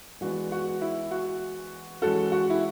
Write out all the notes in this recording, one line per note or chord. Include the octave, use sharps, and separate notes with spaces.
E3 G#3 B3 D4 F#4
F#4
E4
F#4
E3 G#3 C#4 F#4 A4
F#4
E4